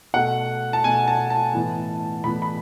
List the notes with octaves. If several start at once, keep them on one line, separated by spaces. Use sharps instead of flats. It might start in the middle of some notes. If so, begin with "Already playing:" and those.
B2 A3 F#5
A5
B2 A3 G#5
A5
A5
A2 E3 B3
A2 E3 B3 B5
B5